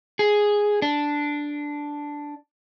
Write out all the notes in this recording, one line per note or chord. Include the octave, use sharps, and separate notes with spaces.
G#4
D4